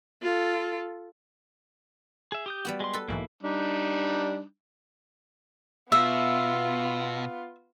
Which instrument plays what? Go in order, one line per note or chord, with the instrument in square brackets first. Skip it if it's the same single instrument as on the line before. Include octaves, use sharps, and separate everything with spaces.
[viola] F4 A4
[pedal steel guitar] G#4 E5
G4 D#6 G6
[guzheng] G3 B3 F#4
[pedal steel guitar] G#3 G4 C6
[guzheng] A4 B4
[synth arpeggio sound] B1 G#2 E3 [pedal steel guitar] A#3 E4
[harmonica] G3 D4 D#4
[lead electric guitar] B2 [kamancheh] B3 F4 [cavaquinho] E5 [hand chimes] E6